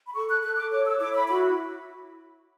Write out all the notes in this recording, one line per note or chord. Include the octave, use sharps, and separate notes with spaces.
B5
A4 C#6
F#6
A4 F#6
D6
C#5 D6
E6
E4 D6
B5
F#4 B5